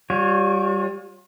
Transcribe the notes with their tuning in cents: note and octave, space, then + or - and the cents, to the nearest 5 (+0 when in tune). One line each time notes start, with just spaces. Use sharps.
G3 +0 F4 +45 C#5 +0